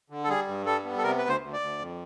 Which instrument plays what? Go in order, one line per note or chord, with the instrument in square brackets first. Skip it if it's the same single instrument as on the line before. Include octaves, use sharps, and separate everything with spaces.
[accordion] D3
A4
G3 G#4
G2
G3 A4
B3
A4
C3 A#4
D2 B4
C5
D2
D5
D2
F2